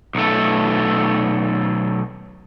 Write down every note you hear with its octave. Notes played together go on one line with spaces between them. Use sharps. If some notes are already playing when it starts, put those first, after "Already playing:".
B1 A3